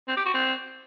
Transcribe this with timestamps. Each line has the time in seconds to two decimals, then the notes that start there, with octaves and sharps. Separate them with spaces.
0.08 C4
0.17 G4
0.25 F#4
0.34 C4